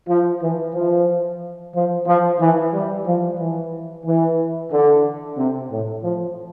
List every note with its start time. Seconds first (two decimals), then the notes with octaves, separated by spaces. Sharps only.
0.09 F3
0.42 E3
0.75 F3
1.75 F3
2.07 F3
2.40 E3
2.74 G3
3.07 F3
3.39 E3
4.05 E3
4.72 D3
5.38 C3
5.71 A2
6.03 F3